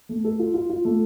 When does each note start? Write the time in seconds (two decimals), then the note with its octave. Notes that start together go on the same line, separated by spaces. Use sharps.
0.09 A3
0.24 A4
0.39 F4
0.54 F4
0.70 F4
0.85 A3